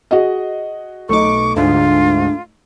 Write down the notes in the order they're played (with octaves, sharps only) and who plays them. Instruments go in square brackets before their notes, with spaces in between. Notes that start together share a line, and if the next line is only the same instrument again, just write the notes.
[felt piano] F#4 G#4 D#5
[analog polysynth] B1 D6 [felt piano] A3 D#4 [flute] C#6
[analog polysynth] D2 G#2 [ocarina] D4 [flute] F4